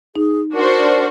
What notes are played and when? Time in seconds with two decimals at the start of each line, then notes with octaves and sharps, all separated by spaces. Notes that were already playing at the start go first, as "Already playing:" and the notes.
0.16 D#4 G#4
0.53 D4 F#4 A#4 C5